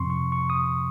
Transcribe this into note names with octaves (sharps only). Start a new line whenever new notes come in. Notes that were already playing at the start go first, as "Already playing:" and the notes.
Already playing: F2 C3 F3 C4 C6 C#6
C#6
C#6
D#6